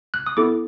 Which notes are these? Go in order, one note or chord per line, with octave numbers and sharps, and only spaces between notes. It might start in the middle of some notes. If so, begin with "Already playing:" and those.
F#6
D#6
B3 E4 A4 D6